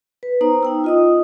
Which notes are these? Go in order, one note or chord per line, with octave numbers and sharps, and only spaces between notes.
B4
B3 D#4 C5 A#5
D#4 G5 E6
F4 D#5 D#6